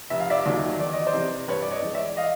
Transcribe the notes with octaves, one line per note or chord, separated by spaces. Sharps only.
F1 E5
F5
D5 E5
D#2 D#3 F#3
E2 D5
D#5
C5 D5
C3 E3
G2 B4 C#5
D5
C#5 D#5
E3 G#3
D5 E5
D#5 F5